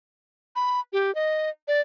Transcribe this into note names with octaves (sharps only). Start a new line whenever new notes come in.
B5
G4
D#5
D5